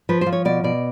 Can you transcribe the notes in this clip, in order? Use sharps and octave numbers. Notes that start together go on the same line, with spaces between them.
F3 B4
C5
F3
C#5
B2 D5
B2 D5